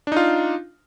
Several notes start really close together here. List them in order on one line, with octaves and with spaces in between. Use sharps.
D4 D#4 F4